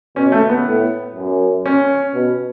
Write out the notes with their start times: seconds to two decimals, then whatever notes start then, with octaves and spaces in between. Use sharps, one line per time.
0.16 B2 C#4
0.32 A3
0.49 B3
0.65 A2
1.15 F#2
1.66 C#4
2.14 B2